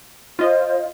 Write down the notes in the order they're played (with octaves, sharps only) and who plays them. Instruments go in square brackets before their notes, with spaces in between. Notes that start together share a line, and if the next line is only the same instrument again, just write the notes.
[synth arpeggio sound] F4 D#5 [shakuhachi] C5